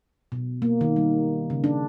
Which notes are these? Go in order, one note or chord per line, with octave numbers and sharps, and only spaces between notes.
B2
A#3
D#3
G3
C#3
D4